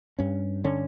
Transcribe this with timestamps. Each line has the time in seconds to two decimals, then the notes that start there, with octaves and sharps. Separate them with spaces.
0.19 G2 C#4
0.64 D3 C#4